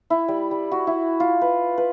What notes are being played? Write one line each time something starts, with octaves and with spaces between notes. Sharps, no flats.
E4
G3
G3
F#4
E4
F4
B4
B4